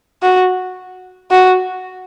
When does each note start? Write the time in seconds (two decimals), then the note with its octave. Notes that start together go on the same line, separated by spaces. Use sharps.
0.23 F#4
1.31 F#4